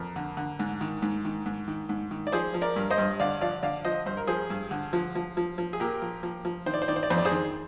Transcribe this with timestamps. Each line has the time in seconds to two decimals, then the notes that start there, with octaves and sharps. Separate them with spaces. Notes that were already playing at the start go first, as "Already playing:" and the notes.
Already playing: F2 A#4
0.16 D3
0.37 D3
0.59 G#2
0.81 D#3
1.02 G#2
1.25 D#3
1.46 G#2
1.68 D#3
1.89 G#2
2.11 D#3
2.27 D5
2.32 F3 G#4 C5
2.54 F3
2.61 A#4 D5
2.76 G2
2.91 C5 D#5
2.98 G2
3.20 D3 D5 F5
3.41 F3 D5 F5
3.63 D3 D5 F5
3.85 F3 C5 D#5
4.06 G2 C5
4.17 A#4
4.27 F3 G#4 C5
4.50 G2
4.71 D3
4.93 F3
5.15 F3
5.37 F3
5.58 F3
5.73 G#4
5.80 A#2 G4 A#4
6.02 F3
6.23 F3
6.45 F3
6.66 D#3 C5
6.74 D5
6.82 C5
6.88 D#3 D5
6.96 C5
7.03 D5
7.10 F2 C5
7.18 D5
7.25 G#4 C5
7.31 D#3